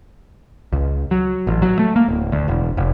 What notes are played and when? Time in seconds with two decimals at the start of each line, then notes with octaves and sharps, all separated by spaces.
0.73 C#2
1.11 F#3
1.47 A1
1.62 F#3
1.79 A3
1.96 A#3
2.09 D1
2.32 D2
2.48 E1
2.77 F1